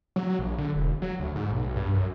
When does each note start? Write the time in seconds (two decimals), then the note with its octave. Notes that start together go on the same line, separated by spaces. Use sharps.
0.16 F#3
0.39 A#1
0.58 D3
0.76 E1
1.02 F#3
1.19 D2
1.36 G#2
1.52 B1
1.76 G2
1.94 F#2